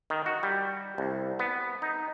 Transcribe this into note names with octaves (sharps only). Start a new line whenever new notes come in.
D#3
F#4
G3
C2
B3
D#4